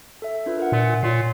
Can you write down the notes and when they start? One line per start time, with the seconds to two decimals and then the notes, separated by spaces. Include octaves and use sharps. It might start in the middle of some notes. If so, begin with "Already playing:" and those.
0.22 A4 E5
0.46 D4 F4 B4
0.58 A#4 E5 F#5
0.72 A#2
1.03 A#2 C#5 C6 C7